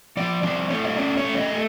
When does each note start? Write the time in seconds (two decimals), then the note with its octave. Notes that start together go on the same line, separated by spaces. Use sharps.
0.17 F3 D5
0.43 C4 D5
0.70 A3 C#5
0.85 D#5
0.97 C#4 D5
1.17 C#5
1.24 A3
1.37 D#5
1.51 A3